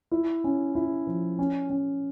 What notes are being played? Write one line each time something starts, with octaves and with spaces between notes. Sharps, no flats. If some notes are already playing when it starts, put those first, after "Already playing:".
E4
C#4
E4
F3
C#4
C#4